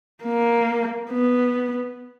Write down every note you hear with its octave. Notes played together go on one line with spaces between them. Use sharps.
A#3
B3